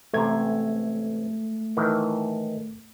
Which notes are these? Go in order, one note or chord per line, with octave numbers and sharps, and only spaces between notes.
A1 C3 A3 A#5 G#6
A2 D#3 E3